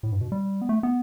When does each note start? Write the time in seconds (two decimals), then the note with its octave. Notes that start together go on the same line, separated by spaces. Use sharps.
0.03 A2
0.12 G2
0.21 B2
0.32 G3
0.62 B3
0.69 A3
0.83 B3